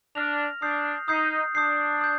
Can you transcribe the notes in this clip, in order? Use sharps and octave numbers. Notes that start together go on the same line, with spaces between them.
D4 F6 A#6 F7
D4 D#6 G6 C7
D#4 D#6 G6 C7
D4 D#6 G6 C7
D#6 G6